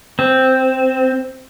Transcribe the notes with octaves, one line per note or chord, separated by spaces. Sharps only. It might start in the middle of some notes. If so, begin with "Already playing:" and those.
C4